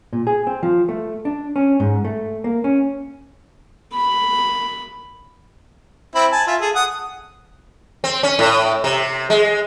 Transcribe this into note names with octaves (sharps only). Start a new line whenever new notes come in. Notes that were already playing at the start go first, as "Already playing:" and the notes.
A#2
G#4
C4
F3
A3
D4
C#4
G#2
A3
A#3
C#4
B5
C4 E4 B5
G#5 A5
F4 E5
G#4 A4
F#5 D#6
C4
C#4
A2
C3
G#3